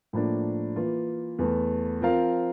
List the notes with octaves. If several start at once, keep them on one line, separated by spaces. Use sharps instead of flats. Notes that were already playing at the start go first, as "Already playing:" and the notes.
A2 F3 A#3 D4
E3 A#3 F4
E2 E3 A3
F3 C4 F4 A#4 F5